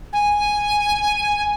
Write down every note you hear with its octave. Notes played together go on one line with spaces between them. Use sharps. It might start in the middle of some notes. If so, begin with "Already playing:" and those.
G#5